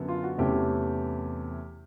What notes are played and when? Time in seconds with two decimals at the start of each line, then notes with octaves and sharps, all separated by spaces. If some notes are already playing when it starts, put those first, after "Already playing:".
Already playing: F#2 D3 F#3 B3
0.08 F4
0.24 F#4
0.38 E2 C3 E3 A3 C#4 G4